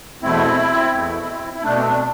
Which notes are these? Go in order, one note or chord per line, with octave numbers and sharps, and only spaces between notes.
E2 B2 A3 C4 E4
E2 B2 A3
E4
B2 A3 D4
C4
D4